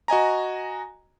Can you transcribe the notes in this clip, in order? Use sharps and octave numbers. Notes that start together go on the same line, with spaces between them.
F#4 D#5 G#5 A#5